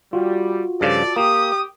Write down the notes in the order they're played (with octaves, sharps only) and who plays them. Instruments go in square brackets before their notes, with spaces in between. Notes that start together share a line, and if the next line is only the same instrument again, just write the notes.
[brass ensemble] G3 [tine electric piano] F4 F#4
[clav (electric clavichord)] G2 C#3 F3 [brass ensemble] A4 D5
[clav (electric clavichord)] A#3 [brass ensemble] G4 [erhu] D#6